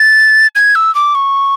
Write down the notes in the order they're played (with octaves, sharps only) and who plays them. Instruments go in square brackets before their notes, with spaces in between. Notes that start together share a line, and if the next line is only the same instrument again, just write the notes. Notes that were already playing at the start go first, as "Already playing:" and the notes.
Already playing: [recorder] A6
G#6
E6
D6
C#6